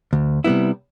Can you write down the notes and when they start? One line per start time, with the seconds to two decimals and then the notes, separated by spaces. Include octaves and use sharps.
0.13 D2
0.44 C3 G3 B3 E4